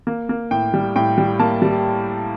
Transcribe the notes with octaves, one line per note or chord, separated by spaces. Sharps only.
A#3
A#3
A2 G5
G3
A2 G5
G3
A#3 A5
G3